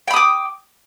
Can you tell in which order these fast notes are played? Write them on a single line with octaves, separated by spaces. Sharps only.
G5 B5 D#6 D6